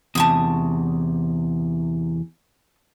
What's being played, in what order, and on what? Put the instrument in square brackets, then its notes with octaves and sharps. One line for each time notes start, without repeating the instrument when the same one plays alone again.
[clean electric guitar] E2 C3 [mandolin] A5 C#6 D#6